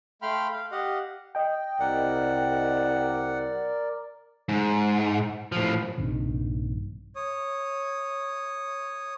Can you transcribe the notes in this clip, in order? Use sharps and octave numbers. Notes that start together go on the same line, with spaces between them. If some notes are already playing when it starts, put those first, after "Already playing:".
A3 F5 G5 B5 C6 F6
F5
G4 D#5 F5 F#5
D#5 G5
C2 A#4 D5 F#5
G#2
A2 F3
A#1 G2 C3 D#3
C#5 D#6